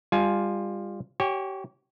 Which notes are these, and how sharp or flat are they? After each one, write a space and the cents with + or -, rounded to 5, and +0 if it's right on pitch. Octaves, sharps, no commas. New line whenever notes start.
G3 +30 F4 +0 G#5 +30
G4 -30 C#5 +0 G#5 -45